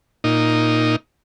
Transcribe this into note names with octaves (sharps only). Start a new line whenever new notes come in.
A#2 D#4